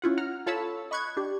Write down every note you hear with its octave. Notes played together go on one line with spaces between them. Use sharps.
C#4 E4 F4 F#5
F#5 A#5 F6
F4 A4 C#5 A5 B5 E6
D#5 B5 C#6 F#6 G#6
D4 G4